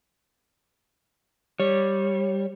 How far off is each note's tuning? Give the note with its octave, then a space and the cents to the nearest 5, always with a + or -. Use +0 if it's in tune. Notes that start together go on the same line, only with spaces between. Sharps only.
G3 +0 C#5 -20